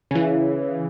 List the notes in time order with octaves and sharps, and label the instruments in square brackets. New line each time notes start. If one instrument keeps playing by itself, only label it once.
[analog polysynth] C#3 E3